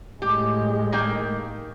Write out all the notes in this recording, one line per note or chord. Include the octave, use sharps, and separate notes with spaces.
A2 G#3 G4
D#3 A#3 G5